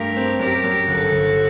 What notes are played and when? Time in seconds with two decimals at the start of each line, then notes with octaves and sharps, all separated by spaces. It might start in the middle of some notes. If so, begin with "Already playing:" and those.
Already playing: G2 A3 G4 A#4
0.17 C4
0.40 F#2 G4 A#4
0.64 F#2
0.87 G1 F#4 A4
1.12 G1